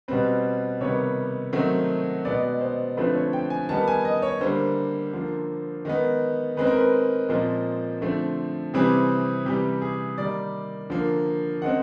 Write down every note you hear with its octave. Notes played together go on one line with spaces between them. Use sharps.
B2 G3 C4 B4
C3 D#3 G3 B3 C#5
D#3 F#3 A3 C4
B2 G#3 B3 D5
C5
D3 F3 A3 C4 B4
C#5
G5
G#5
D#3 G3 B3 A5
G#5
D#5
C#5
D3 G3 A#3 C5
D3 F3 A#3
D#3 G#3 B3
D#3 G#3 C4 B4
A#4
B4
A#2 F3 G#3 C4 C5
D3 F3 A3 C4
C3 E3 G3 C4 G#4
C3 E3 G3 G4
G#4
D#3 G3 A#3 D5
D3 F3 A#3
D#3 G#3 C4 F#5